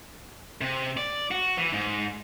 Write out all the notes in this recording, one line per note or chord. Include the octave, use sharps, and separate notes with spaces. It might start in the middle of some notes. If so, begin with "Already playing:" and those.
C3
D5
F#4
E3
G#2